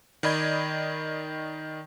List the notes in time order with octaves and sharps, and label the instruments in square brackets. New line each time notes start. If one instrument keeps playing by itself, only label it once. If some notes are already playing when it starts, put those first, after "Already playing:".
[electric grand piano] D#3 D5 D#5 B5 G6 G#6